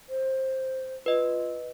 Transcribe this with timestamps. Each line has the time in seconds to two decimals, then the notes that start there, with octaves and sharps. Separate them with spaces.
0.09 C5
1.06 F4 B4 D#5